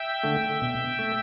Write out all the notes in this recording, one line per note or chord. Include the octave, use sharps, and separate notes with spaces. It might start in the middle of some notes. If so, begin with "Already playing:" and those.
Already playing: E5 G5
D3 A3
B2
A3